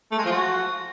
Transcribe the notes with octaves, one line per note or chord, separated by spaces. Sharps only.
A3
G#3
F3
F#4